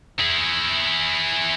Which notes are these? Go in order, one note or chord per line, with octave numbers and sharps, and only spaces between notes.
E4 G#4